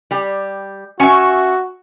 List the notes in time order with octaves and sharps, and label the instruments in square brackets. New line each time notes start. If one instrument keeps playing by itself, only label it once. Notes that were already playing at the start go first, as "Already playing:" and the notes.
[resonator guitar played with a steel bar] G3 G4
[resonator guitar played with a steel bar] C#4 G#5 [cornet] F#4 [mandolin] E5 C#6